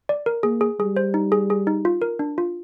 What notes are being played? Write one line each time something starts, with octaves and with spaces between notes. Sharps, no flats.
D5
A#4
A#3 G#4
G#4
G3 G#4
C5
D#4
G#4
G#4
D#4
F4
A#4
D4
F4